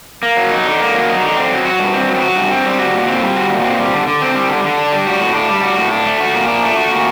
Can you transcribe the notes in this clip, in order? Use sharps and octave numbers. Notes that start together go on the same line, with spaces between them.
A#3
F#3
D#4
D3
A#3
F#3
D#4
D3
C4
F#3
F#4
G2
C4
F#3
F#4
G2
C4
G3
F#4
A#2
C4
G3
F#4
A#2
C4
G3
D3
D3
C4
G3
D3
D3
D4
G3
F#4
A2
D4
G3
F#4
A2
D4
A3
F#4
A#2
D4
A3
F#4
A#2